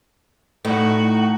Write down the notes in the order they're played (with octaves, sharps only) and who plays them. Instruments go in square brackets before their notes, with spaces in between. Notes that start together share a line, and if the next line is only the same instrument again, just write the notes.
[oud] A2 [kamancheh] D#4 F#4